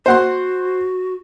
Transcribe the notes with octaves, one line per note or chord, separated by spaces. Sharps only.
F#4 C5 F#5 C6